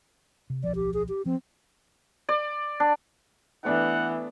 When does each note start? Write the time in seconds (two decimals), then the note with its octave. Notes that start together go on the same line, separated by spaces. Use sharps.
0.50 C3
0.64 D1 B1 F3 D5
0.75 G4
0.94 G#4
1.09 G4
1.26 F3 C4
2.29 D5
2.80 D4
3.65 E3 A3 B3 D4 F#5